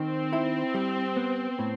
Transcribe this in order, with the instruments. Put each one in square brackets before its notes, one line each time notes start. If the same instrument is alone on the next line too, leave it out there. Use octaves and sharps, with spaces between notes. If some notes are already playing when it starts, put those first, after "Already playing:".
Already playing: [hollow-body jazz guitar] D#3 [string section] C4
[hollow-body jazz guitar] E4
G3
B3
A2